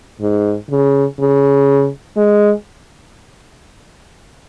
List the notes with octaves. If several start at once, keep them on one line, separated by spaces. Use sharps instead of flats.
G#2
C#3
C#3
G#3